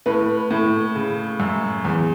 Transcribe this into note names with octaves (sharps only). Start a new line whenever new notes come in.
A2 B4
A2
C#3
F#2
E2